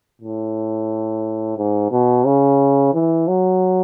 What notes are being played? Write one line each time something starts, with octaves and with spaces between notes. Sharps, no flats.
A2
G#2
B2
C#3
E3
F#3